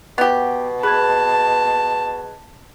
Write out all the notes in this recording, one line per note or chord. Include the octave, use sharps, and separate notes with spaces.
B2 B3 G4 F#5
G#4 B4 A5 F#6 G#6